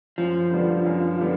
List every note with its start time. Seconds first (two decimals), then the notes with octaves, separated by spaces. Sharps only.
0.18 F#2 F3
0.51 D3 G3 B3 D4
0.86 F#2
1.20 D3 G3 B3